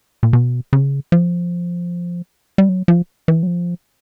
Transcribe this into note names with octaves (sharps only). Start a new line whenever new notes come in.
A#2
B2
C#3
F3
G3
F#3
F3
E3
F#3
F3